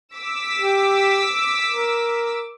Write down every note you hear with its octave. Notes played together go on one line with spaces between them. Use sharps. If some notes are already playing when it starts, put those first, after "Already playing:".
D6 E6 B6
G4
A#4